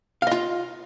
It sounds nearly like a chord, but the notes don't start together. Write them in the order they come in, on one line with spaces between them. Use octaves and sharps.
F5 D#5 F4